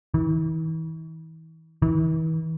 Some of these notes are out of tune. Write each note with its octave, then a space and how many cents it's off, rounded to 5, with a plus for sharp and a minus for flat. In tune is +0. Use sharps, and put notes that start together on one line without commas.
E3 -40
E3 -40